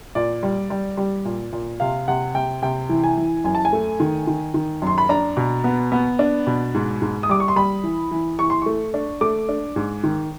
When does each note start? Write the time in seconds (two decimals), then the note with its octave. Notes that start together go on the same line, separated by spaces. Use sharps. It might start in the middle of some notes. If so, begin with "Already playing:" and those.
0.15 A#2 D5
0.43 G3
0.70 G3
0.97 G3
1.25 A#2
1.53 A#2
1.80 C3 F5
2.08 C3 F#5
2.34 C3 G5
2.62 C3 G5
2.89 E3
3.04 G#5
3.17 E3
3.44 F#2 G#5
3.55 A5
3.65 G#5
3.73 A3
4.00 D#3
4.27 D#3
4.54 D#3
4.82 F#2 C6
4.98 B5
5.09 D4 A#5
5.37 B2
5.64 B3
5.92 B3
6.19 D4
6.47 B2
6.74 G#2
7.02 G#2
7.23 D#6
7.29 G3 D6
7.40 C#6
7.48 C6
7.56 G3 B5
7.84 E3
8.11 E3
8.39 E3 C#6
8.50 C6
8.62 A3 C#6
8.94 D4
9.21 A3 D6
9.49 D4
9.76 G#2
10.04 D#3